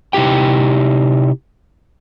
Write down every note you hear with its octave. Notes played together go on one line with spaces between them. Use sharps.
C3 D#4 E4 G4 G5